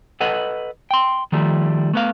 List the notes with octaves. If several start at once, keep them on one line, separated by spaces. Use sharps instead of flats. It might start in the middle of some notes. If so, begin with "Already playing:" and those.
A4 B4 D#5 F#5
G5 C6
D#3 F3 G3 A3
A3 B3 F5